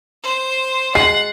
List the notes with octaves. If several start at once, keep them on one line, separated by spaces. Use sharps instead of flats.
C5
G#3 F#5 C7